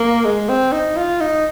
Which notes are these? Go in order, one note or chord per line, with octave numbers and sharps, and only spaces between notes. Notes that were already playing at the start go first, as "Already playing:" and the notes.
Already playing: A#3
G#3
C4
D#4
F4
D#4